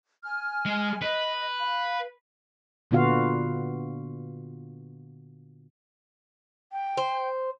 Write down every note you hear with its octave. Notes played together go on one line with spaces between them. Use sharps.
G#5 F6
G#3
B4 D#5
F5 B5
A#2 D3 B3 F4 F#4 F5
G5
C5